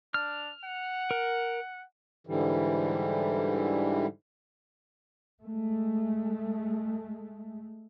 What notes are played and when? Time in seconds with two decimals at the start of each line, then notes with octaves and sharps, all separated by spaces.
0.14 D4 F6
0.65 F#5
1.11 A#4
2.27 G#2 D3 E3 G3
5.44 G#3 A3